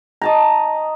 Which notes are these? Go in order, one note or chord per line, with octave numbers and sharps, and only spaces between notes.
D#5 A5 A#5